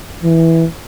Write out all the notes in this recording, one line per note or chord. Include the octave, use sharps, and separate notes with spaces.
E3